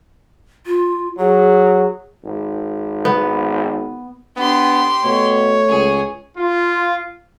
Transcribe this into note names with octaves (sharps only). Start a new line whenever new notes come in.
F4
F#3 G#4
G#1
B3
B3 D4 G4 C6
B2 A3 C#5
C#2 G#4
F4